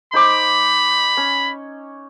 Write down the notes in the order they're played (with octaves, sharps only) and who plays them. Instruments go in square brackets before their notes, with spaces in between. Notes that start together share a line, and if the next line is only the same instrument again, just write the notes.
[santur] D#4 C5 D6 [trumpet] B5
[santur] C#4